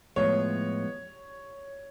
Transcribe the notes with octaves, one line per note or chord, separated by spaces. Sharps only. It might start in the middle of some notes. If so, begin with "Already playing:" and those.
A2 F3 G#3 B3 C#5